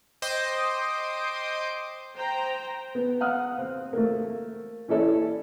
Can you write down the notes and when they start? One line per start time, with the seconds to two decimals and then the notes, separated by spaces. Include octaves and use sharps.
0.22 C5 D#5 G5 C6 D6 D#6
2.16 C5 G5 A#5
2.95 B3
3.21 F5 F#5 D#6 F6 F#6
3.58 C4
3.93 A3 A#3
4.88 E3 C#4 E4 A4 D5 E5